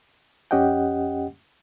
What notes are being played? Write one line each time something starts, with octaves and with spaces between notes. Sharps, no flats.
F2 C#4 G4 D#5 F#5 G5